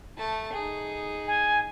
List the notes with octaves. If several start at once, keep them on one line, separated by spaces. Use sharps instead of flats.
A3 A5
D#4 G#4
G#5